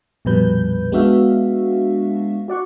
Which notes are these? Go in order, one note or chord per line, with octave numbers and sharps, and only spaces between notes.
A#1 F2 B2 G3 B4 G6
G#3 B3 D4 F#4 E5 F5
F#4 D5 F#5 C#6